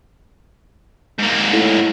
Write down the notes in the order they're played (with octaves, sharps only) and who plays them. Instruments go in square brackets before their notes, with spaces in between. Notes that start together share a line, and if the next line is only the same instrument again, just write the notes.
[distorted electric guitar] G#2 A#3
[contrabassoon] A2